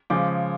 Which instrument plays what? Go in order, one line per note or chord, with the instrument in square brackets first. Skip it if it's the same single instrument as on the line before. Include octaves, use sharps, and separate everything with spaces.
[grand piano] C#3 F3 G#3 D6